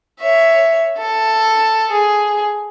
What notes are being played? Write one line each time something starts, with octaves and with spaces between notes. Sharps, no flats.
C#5 E5
A4
G#4